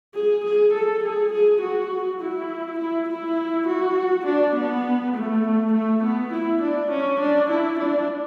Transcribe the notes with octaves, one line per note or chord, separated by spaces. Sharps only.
G#4
G#4
A4
G#4
G#4
F#4
E4
E4
E4
F#4
D4
B3
A3
A3
B3
E4
D4
C#4
D4
E4
D4